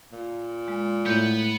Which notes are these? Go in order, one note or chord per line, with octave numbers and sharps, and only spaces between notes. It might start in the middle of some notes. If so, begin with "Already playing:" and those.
A#2
G#3
A2 B3 B4 G6